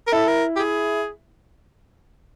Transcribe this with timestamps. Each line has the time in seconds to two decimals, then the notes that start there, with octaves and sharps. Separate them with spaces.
0.07 A#4
0.12 E4 A4
0.28 A#4
0.56 G4
0.59 G#4